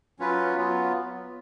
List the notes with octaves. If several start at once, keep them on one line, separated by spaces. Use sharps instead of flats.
F#3 C#4 F4 B4
F#3 B3 F4